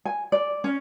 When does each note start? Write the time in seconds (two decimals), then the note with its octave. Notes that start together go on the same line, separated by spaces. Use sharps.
0.05 G#5
0.32 D5
0.64 C#4